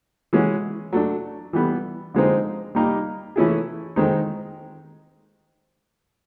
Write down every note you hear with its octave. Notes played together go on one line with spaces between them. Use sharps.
E3 G#3 C#4 F#4
F#3 A3 D4
E3 G3 B3
D3 F3 G#3 C4 D#4
G3 A#3 D#4 G4
E3 A3 C#4 E4 G#4
D#3 G#3 C4 D#4